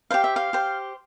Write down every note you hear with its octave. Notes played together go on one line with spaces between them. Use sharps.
G4 C5 F5
E5
F5
G4 C5